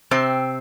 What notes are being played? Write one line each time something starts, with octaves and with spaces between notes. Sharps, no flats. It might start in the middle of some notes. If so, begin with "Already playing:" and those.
C3 C4